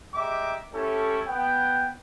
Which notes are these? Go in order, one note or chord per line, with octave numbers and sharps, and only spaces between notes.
G3 G#3 E5 G5 A#5 D6
A3 C#4 E4 G4 A4
B3 G5